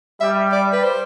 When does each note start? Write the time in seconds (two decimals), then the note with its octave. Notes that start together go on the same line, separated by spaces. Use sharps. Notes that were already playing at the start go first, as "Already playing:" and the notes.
0.21 G3 E5
0.52 D5
0.73 B4
0.83 C5